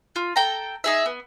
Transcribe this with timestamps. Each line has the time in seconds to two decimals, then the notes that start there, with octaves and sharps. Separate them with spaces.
0.16 F4
0.36 A4 G5 A#5
0.84 D#4 G#4 E5
1.06 B3